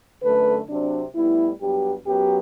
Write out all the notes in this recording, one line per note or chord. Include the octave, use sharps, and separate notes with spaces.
F#2 D3 A3 B4
C3 F#3 C4 D4
A2 G3 B3 E4
G2 F#3 B3 G4
F#2 F#3 B3 G4